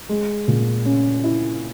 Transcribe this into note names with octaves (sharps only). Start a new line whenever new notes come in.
G#3
A#2
C#4
E4